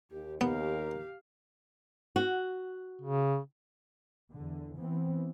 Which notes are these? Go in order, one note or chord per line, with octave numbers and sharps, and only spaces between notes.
D#2 G4
D#2 B3 G4 A#4 F5
F#4
C#3
E2 D3
E3 B3 C4